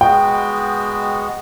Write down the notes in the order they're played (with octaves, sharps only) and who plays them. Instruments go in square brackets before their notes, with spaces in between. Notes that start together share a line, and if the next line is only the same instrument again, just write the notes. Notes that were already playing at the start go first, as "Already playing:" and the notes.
[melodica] G#3 B3 F#4 [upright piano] G5